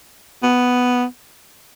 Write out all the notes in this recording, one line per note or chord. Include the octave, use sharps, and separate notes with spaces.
B3